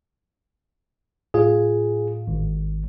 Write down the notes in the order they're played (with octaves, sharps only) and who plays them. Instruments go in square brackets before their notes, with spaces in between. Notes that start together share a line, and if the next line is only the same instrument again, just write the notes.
[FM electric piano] A2 F4 [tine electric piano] G#4
[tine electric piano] G#1